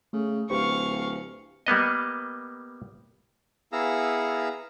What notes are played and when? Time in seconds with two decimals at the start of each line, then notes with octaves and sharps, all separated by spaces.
0.13 C#3 A3
0.50 D1 G4 B4 C5 F5 C#6
1.67 G3 A#3 B3 D#5
3.72 B3 E4 G#4 F5 A#5 E6